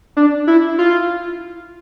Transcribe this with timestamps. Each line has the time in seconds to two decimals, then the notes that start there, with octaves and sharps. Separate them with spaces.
0.17 D4
0.47 E4
0.78 F4